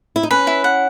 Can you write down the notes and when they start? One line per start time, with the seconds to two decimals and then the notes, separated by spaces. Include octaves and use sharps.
0.16 E4
0.23 D#4
0.31 C#4 B4
0.47 E4
0.64 F#5